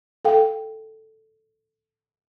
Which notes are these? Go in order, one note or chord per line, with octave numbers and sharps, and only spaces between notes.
A4 F5 G5